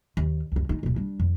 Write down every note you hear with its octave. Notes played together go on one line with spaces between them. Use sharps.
D#2
C#2 F#2
G#3 D#4
D#1 B1
G3 D4
F2